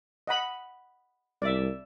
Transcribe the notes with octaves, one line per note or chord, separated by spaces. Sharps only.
D#5 F#5 B5
C2 D5 E5